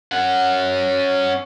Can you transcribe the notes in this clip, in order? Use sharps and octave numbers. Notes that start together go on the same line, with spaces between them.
C#4 F#5